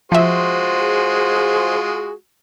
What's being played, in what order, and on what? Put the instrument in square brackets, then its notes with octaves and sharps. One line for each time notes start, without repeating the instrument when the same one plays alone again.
[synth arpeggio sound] F3 E5 [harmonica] G#3 F4 F#4 [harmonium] C5
[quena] G#4